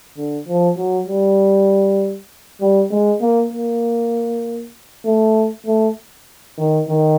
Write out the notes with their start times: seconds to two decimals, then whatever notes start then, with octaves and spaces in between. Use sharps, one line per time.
0.17 D3
0.48 F3
0.77 F#3
1.07 G3
2.61 G3
2.91 G#3
3.21 A#3
3.53 A#3
5.05 A3
5.66 A3
6.58 D#3
6.88 D#3